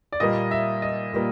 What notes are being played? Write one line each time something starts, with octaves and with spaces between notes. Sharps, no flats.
D5
A#2 G3 A#3 D#5
E5
D#5
A#2 G3 A#3